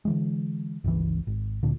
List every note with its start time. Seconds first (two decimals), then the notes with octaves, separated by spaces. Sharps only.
0.05 D3 E3 G#3
0.84 G1 C#2 E3
1.27 G#1
1.63 D2 A#2 D3